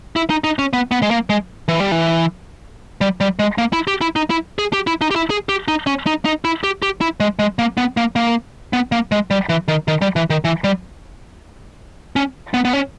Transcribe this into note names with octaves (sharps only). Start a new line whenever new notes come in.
E4
D#4
D#4
C#4
B3
B3
G#3
A#3
G#3
E3
G3
E3
G3
G3
G#3
A#3
E4
G4
E4
D#4
E4
G#4
G4
E4
D#4
G4
E4
G#4
G4
D#4
C#4
D#4
D#4
E4
G4
G4
E4
G#3
G#3
A#3
B3
A#3
A#3
B3
A#3
G#3
G3
E3
D#3
D#3
G3
E3
D#3
E3
G3
C#4
B3
B3
C#4